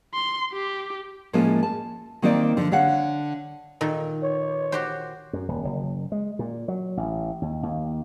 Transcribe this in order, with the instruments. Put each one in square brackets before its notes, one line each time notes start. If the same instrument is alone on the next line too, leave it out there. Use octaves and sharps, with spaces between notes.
[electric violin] C6
G4
[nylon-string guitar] A2 F3 G#3 A#3 C#4
A5
D#3 A#3 C4 D#4 C5 D5
D3 F3
D3 C#5 F5 F#5
[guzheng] A#2 D#3 A4
[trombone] C#5
[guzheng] F#4 G4 C5
[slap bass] F#2
D#1
F#1
G#3
A#2
F#3
A1
D#2
D#2